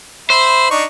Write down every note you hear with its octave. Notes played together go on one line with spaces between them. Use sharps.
C5 E5 B5
D4 D#4 C#6